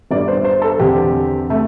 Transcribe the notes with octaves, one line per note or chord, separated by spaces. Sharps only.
G1 G2 G3 D5
C5
C5
A4
E2 D3 C4 G4
C3 A3